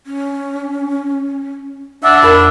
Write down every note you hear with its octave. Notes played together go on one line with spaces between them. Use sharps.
C#4
D4 E5 F#5
F2 A#4 B5 A6